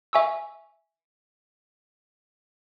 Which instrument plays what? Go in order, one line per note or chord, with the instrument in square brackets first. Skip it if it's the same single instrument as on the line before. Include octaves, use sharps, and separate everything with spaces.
[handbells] E5 G#5 C#6 E6